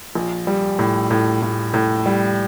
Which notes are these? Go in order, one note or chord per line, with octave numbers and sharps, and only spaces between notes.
A#1
G3
A2
A2
A2
A2
G3